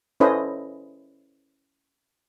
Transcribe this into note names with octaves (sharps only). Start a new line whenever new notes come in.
C#4 E4 A4 B4 C5 D#5